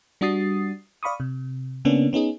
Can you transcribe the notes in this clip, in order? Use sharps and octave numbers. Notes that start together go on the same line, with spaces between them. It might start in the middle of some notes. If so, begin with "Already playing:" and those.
G3 D4 F#4 D#6 A6 C7
D5 F5 B5 C#6 D#6
C3
C#3 A#3 B3 C#4 D4
B3 C#4 D#4 G#4